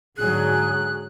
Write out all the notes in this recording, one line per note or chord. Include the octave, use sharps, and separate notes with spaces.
G#2 D3 F#3 G#4 F#6